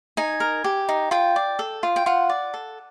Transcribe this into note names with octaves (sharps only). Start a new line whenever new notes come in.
D#4 G#5
A#4
G4
D#4
F4 G5
D5
A4
F4
G5
F4 F#5
D5
A4